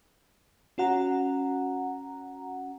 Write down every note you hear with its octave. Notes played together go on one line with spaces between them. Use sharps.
C#4 F#4 F#5 A#5